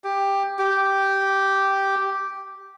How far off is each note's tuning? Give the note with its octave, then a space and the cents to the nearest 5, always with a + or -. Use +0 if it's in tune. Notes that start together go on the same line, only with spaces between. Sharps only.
G4 +10
G4 -5